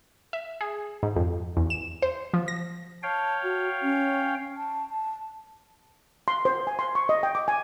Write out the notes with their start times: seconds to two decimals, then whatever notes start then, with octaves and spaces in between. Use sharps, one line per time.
0.33 E5
0.61 G#4
1.03 G#2
1.16 F2
1.57 E2
1.70 E7
2.02 C5
2.34 F3
2.48 A#6
3.03 C#5 F5 G5 A5
3.43 F#4
3.82 C#4
4.57 A5
4.90 A5
6.28 C6
6.45 C5
6.67 G#5
6.79 C6
6.95 C#6
7.09 D#5
7.23 G5
7.35 D6
7.48 G#5